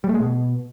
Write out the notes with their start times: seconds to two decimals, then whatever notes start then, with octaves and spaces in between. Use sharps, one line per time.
0.04 G3
0.09 A3
0.14 G#3
0.20 B2